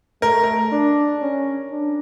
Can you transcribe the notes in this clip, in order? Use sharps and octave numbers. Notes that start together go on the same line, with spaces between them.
A3 A#4
A#4
D4
C#4
D4